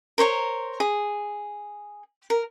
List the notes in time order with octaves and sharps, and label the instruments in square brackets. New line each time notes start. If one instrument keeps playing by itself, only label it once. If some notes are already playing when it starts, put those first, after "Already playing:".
[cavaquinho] A#4 C5 C#5 A#5
G#4
A#4